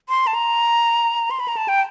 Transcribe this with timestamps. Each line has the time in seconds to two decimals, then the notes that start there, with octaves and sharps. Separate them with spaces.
0.09 C6
0.27 A5
0.34 A#5
1.31 C6
1.40 B5
1.48 A#5
1.57 A5
1.68 G5